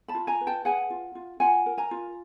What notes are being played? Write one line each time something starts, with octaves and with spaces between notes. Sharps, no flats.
A5 B5
F4
G#5 A#5
B4
G5 A5
G#4 F#5 G#5
F4
F4
F4 F#5 G#5
A#4
G#5 A#5
F4